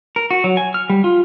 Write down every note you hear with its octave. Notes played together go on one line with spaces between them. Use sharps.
A#4
F#4
F#3
G#5
F6
G3
F4